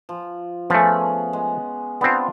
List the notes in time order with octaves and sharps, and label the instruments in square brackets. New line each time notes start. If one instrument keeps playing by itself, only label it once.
[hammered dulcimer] F3
[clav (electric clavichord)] F3 A3 [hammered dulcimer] B3 C#4 G#4
[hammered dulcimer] G#3
[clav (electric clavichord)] B3 C4 [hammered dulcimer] D4 F4